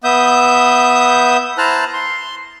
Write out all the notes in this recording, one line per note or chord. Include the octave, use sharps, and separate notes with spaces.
B3 E5 D#6 G6
E4 C5 A5 A#5 F6 F#6
C6